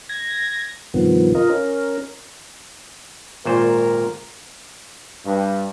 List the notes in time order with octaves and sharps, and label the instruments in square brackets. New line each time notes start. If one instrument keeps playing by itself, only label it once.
[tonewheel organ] G#6 A#6
G2 C3 D#3 F3 B3
F4 A#4 D#5
C#4 A#4
[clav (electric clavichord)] G#1 A#2 C5 [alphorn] A#4
[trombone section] G2